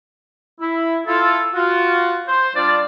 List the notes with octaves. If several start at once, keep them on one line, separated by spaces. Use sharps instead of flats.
E4
E4 F4 A4
F4 F#4
C5
G3 D4 F4 D5